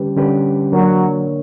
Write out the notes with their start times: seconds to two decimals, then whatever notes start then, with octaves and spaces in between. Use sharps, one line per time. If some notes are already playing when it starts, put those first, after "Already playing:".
Already playing: D3 G3 C#4 G4 B4
0.16 D3 G3 C#4 G4 B4
0.72 D3 F#3 A#3 D4 A#4 C#5